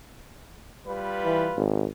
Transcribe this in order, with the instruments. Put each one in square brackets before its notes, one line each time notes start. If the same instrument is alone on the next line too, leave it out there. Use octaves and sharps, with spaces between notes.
[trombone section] G3 F4 B4
[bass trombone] E3
G#1